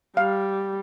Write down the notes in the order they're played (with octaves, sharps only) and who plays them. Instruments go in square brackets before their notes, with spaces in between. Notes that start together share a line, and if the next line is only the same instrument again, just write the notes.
[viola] G3 [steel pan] F5